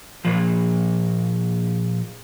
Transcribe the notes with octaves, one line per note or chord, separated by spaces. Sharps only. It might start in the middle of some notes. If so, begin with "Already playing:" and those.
A#2 F3